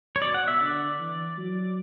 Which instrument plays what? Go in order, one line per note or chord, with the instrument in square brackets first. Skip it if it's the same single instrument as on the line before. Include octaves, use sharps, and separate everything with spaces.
[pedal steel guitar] C#5
[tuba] B2 [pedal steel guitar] D5
[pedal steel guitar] F#5
E5
[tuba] D3 [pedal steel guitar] D5
[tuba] E3
F#3